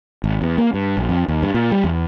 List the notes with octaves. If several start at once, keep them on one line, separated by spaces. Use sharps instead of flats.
G#1
E2
A#3
G2
A#1
F2
D#2
G2
A#2
G3
E2